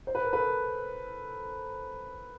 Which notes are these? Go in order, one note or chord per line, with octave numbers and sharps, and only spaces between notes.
C5
B4
A#4
A4 B4